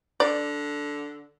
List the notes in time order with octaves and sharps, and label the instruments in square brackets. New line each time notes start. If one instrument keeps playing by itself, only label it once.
[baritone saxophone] D3 [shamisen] D5